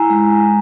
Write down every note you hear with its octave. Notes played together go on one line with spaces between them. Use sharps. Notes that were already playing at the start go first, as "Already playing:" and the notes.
Already playing: E4 G#5 A#5
G#3